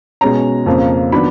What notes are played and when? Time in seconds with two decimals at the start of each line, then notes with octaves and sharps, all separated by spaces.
0.21 B2 G#3 C#4 A#5
0.66 F2 C#3 F3 A#3
1.12 D#3 F#3 B3 D4 B5